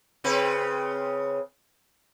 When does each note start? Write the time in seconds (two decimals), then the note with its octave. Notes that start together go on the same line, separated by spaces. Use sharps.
0.24 C#3 C4 B4